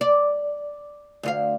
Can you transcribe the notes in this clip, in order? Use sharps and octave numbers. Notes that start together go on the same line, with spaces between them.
D5
D2 F4 F5